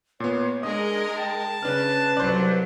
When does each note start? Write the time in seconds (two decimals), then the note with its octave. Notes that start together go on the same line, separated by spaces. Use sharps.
0.20 A#2 B3 C#5
0.63 G#3 D4 A#4 D#5 D#6
1.17 G5 A5
1.63 C#3 D4 B4 F6
2.17 C2 F#3 C5 D5